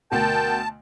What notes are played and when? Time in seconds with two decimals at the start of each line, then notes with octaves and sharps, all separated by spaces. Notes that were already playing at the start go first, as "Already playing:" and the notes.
0.12 D2 B2 A#4 G5 A5